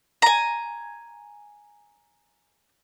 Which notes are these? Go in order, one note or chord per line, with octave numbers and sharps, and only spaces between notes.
G#5 A#5